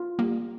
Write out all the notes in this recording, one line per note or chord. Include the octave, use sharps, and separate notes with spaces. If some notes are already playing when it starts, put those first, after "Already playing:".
Already playing: F4
G3 A#3